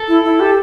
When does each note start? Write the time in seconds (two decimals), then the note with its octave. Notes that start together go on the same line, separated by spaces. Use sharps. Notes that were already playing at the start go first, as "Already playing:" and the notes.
Already playing: A4
0.08 E4
0.24 E4
0.40 G4